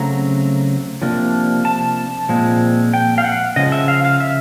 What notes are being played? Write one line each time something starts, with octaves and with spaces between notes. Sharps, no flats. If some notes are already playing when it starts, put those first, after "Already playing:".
Already playing: C#3 F#3 A3 C4 A#5
C3 F3 A#3 D4
A5
A#2 F3 G#3 C4
G5
F5
F#5
C#3 F3 G#3 D#5
E5
F5
F5
E5